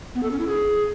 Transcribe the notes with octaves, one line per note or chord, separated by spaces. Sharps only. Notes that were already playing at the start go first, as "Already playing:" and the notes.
B3
A4
C#4
E4
G#4